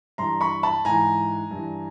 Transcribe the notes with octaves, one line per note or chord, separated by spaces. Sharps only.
G2 E3 A#5 C6
B5 C#6
A5 B5
G#2 E3 G#5 A#5
G2
E3